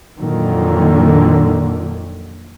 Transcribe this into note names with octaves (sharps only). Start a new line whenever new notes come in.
F2 A#2 D3 D#3 F#3